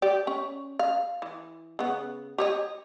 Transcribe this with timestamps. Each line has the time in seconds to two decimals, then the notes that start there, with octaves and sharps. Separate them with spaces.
0.02 G4 D5
0.27 C#4
0.79 F5
1.22 E3
1.79 C#3 B3
2.38 G4 C#5 D#5